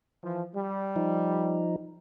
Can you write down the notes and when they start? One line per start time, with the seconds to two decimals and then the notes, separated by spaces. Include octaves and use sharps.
0.23 E3 F3
0.55 G3
0.96 F3 D#4